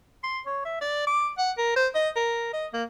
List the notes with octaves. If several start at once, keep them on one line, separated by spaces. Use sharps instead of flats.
C6
C#5
E5
D5
D6
F#5
A#4
C5
D#5
A#4
D#5
A#3